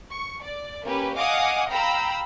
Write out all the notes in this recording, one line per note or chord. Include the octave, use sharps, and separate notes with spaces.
C#6
D5
A#3 C#4 G4 B4
D#5 F5 F#5 G#5 D6 D#6
F5 G5 A#5 B5 E6